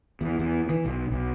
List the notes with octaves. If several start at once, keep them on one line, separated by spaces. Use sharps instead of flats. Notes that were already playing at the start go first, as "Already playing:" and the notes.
E2
E2
E3
B1
B1